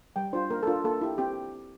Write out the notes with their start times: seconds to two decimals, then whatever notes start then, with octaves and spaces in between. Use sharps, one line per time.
0.16 G3 G5
0.33 D4 F4 C5
0.50 A#3 A#4
0.63 A4
0.67 D4 F4 A#4
0.84 A#3 A4
1.01 E4 G4
1.18 C4 G4